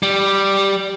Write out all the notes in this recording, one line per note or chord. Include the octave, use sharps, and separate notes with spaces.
G3